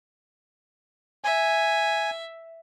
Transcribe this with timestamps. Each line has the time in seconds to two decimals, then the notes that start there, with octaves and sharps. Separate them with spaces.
1.24 E5 G#5